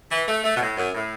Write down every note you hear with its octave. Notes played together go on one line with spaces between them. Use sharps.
E3
A3
A3
B2
A2
F#2
A2